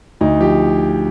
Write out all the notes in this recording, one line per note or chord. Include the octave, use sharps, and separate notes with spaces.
D2 D#4
F3 G4